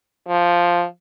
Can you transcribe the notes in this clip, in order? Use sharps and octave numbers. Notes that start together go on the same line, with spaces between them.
F3